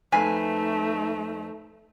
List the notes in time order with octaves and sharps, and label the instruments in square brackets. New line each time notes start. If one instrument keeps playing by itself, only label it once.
[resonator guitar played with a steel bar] F2 B4 G#5 [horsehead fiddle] A3 D#4